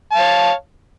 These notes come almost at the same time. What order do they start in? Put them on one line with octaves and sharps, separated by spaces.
A5 F5 C#5